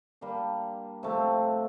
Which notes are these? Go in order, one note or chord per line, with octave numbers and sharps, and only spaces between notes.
G3 A#3 D4
C3 F3 A3 C4